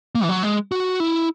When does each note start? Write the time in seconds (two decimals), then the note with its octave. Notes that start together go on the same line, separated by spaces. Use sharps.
0.15 A#3
0.24 E3
0.29 F#3
0.43 G#3
0.72 F#4
1.00 E4